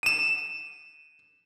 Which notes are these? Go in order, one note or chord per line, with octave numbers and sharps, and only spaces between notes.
D#7 E7